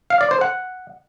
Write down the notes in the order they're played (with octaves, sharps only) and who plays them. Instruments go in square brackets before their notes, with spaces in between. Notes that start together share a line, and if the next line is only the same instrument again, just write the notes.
[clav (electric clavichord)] F5
D5
C5
F#5